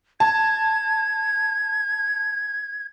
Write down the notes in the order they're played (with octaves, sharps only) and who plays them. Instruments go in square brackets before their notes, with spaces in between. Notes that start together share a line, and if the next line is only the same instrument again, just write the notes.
[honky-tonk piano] A5 [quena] G#6